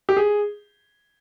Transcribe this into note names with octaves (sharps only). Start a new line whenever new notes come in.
G4
G#4